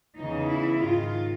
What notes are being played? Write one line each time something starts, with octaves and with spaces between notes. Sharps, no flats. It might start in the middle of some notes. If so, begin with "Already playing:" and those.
E2 C#3 E3 D#4
E4
G#2 D#3 F4